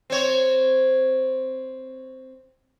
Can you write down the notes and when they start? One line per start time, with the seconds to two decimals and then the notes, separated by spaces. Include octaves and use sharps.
0.10 C4 C#5